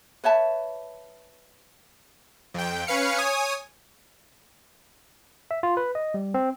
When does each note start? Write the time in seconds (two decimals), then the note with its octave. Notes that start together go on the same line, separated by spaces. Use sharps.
0.24 B4 C#5 E5 A5
2.54 F2 G5
2.87 C#4 B4 F5 C#7
3.18 C#5 G#5 D#6
5.51 E5
5.63 F4
5.77 B4
5.95 D#5
6.14 G3
6.34 C4